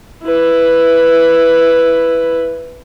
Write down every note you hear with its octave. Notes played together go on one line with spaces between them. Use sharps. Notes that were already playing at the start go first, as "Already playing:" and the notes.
E4 B4